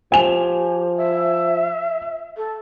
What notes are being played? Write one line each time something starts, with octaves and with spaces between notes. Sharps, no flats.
F3 G4 G#5 F7
E5
A4